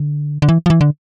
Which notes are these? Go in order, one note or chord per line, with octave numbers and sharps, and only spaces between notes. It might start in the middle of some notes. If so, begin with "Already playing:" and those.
Already playing: D3
D3
E3
F3
E3
D3